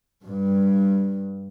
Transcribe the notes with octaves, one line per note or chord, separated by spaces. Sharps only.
G2